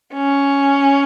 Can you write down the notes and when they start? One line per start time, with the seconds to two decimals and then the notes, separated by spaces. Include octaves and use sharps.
0.14 C#4